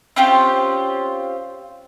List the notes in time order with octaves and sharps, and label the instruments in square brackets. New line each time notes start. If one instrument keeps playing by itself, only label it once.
[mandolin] C4 C#4 F4 G4